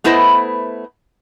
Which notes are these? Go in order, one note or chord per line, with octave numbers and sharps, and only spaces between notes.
A3 B3 E4 B4 C5 D#5